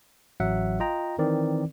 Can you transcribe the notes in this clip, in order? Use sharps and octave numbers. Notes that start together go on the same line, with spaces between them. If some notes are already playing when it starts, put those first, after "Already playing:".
A1 F#3 E5 F#5
F4 D#5 G5 A#5
D#3 E3 C4 A#4 D5